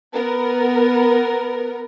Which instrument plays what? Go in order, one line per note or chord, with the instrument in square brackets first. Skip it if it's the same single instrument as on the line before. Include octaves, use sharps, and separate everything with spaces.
[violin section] B3 A#4